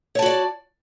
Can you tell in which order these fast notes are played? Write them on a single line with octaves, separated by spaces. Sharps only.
C#5 A5 F#4 D5